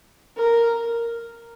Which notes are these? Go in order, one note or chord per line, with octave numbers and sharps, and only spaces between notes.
A#4